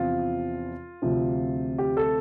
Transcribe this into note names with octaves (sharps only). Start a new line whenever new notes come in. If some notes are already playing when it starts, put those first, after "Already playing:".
Already playing: E2 C3 F3 C4 E4 F4
D2 C3 F3 C4
G4
A4